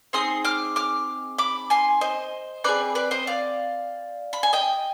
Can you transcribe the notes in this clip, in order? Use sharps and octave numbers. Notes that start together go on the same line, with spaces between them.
C4 D#4 G#4 C6 D#6
D6 F6
D6 F6
B5 D6
G#5 C6
C5 D#5
C4 D#4 G#4 B4 D5
B4 D5
C5 D#5
D5 F5
B5
G#5
D#5 G5